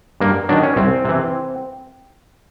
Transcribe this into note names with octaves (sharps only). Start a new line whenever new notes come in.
G2 A#3
D#3 F#3 D4
C#4
C2 C4
C3 E3